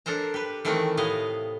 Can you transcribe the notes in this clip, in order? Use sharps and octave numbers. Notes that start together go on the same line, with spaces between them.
D4 A4 A#4 C5 A#5
G4 B4
D#3 E3 A3 C4 A#4 F#5
A2 C3 B3 E4 D#5 F5